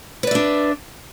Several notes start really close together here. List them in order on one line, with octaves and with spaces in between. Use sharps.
B4 D5 E5 D4